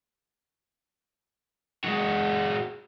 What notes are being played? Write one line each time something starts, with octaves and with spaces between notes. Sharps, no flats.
G#3 F#4